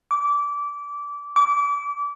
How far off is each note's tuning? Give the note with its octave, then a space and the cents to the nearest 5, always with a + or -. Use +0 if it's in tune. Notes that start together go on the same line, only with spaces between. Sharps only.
D6 -20
D6 -30